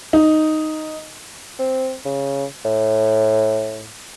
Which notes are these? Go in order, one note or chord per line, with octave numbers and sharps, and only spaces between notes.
D#4
C4
C#3
A2